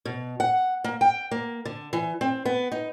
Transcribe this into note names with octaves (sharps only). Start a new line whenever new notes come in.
B2
F#5
A#3
G5
A#3
D3
E3
C4
B3
D#4